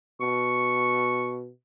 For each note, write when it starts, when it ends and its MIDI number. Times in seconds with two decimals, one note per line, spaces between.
0.21 1.50 47
0.21 1.35 85